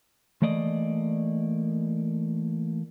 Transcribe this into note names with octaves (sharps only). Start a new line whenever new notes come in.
E3 A3 A#3 D5 D#5